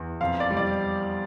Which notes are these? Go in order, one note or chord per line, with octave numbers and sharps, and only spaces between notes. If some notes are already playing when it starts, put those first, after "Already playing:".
Already playing: E2
F2 F5
D5
G3
D5